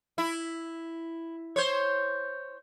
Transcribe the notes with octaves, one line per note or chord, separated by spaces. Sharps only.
E4
C5 C#5